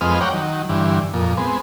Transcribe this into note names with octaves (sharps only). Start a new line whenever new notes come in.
F2 G#3 C4 B4 D#5 F6
C#5 D5 F#5 G5 A#5
D#3 F#3
G2 D3 E3
F2 A#2
G#3 B3 C4